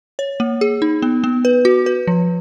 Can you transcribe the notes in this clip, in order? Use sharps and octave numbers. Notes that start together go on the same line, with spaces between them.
C#5
A#3
G#4
D#4
B3
B3
B4
F#4
B4
F3